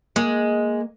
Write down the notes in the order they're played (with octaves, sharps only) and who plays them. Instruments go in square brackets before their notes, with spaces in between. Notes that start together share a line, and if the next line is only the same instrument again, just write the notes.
[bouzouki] G#3 [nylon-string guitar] A#3